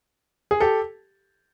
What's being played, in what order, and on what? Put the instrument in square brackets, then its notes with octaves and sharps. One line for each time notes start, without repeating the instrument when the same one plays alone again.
[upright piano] G#4
G4 A4